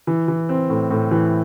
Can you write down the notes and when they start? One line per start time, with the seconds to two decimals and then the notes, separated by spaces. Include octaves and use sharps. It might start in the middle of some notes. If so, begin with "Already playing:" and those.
0.07 E3
0.28 E3
0.49 C4
0.69 A2
0.91 A2
1.11 E3